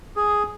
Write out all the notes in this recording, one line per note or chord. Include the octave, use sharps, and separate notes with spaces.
G#4